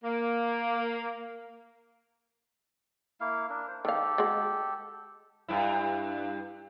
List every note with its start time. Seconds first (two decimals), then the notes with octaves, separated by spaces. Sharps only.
0.04 A#3
3.21 A#3 E4 F5
3.49 D4 A#4
3.68 C5
3.85 D#3 G4 A4 F5
4.18 G#3 F#4
5.48 G2 E4